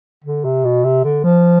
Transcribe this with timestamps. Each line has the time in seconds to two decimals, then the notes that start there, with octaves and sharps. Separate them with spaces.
0.24 D3
0.45 C3
0.65 B2
0.85 C3
1.04 D3
1.24 F3